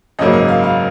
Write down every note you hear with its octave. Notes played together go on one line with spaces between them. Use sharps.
G#1 F#2 C#3 F#3 A#3 D#5
D#5
F5
F5